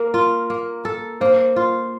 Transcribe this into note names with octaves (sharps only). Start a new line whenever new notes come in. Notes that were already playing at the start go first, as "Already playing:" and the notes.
Already playing: A#3 A#4
F4
A#3
A4
A#3 C5
F4